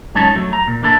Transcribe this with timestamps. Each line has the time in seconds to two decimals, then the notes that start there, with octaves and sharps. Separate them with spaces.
0.15 F#2 G#3 C#4 D#4 C#5 A5
0.35 F#3 A3
0.53 A#5
0.67 A#2
0.83 A#3 D4 E4 A4